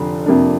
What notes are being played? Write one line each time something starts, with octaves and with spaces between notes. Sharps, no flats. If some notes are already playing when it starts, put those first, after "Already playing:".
Already playing: F1 F2 D3
F2 C3 A#3 D4